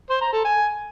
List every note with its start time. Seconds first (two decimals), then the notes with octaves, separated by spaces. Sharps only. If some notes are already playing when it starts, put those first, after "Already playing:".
0.10 C5
0.22 A#5
0.33 A4
0.45 G#5